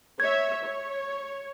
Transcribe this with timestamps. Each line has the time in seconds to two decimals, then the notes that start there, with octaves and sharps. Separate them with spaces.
0.20 C#5 E5 G#6
0.63 C#5